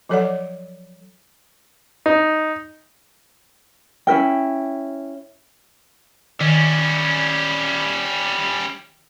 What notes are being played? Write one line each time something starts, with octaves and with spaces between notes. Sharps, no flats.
F3 F#3 A4 C#5 D5 F#5
D#4
C#4 E4 A#4 G5
D#3 G3 C#4